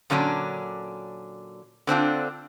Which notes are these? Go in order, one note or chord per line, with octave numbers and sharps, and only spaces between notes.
A#2 D3 F#3 C#4 D4
D3 C4 D4 F4